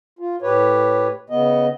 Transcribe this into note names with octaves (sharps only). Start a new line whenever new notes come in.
F4
A2 G4 B4 C#5
C#3 B3 D#5